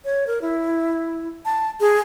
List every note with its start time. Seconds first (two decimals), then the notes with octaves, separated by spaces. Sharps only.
0.05 C#5
0.27 A#4
0.42 E4
1.45 A5
1.80 G#4